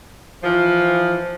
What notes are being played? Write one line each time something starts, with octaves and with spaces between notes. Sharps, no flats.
E3 F3